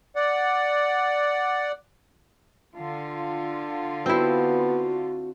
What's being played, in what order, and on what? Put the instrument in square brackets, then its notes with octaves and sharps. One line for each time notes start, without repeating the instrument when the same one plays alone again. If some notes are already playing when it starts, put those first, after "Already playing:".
[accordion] D5 F#5
[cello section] D3 F4
[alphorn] B3 [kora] C4 E4 [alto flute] F#4